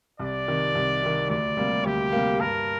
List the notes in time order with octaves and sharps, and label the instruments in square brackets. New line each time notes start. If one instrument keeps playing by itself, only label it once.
[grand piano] C2 [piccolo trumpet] D5
[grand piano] C3 D#3
C2
C3 D#3
[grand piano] D2 [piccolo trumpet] D5
[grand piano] C3 G3 A#3
[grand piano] D2 [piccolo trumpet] G4
[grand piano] C3 G3 A#3
[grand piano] G2 [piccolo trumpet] A#4